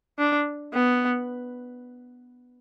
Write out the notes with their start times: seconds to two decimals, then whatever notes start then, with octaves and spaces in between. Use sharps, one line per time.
0.18 D4
0.74 B3